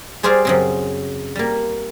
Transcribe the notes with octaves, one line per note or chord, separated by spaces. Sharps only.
G3 G#4 C5 D5 F5
F#2 C#3 C4
G3 A#3